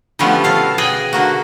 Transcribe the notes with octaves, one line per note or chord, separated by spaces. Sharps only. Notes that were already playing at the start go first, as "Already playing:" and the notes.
D3 F3 G3 A3 B3 C#4
B2 A4 F5
G#4 D#5 F#5 G5
D3 A#3 F#4